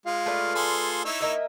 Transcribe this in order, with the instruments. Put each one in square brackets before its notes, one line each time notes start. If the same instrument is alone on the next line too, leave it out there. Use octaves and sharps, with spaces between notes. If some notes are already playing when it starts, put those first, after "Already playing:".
[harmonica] G#3 [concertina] F4 F5
[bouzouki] A3 B4 D5
[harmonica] G#4 A4 C6
[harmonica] D#4 E4 C#5 [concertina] E6
[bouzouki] A#3 D#5 E5